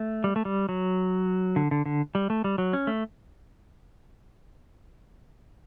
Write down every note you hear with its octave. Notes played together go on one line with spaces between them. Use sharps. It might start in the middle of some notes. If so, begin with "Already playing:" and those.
Already playing: A3
G3
A3
G3
F#3
D3
D3
D3
G3
A3
G3
F#3
C#4
A3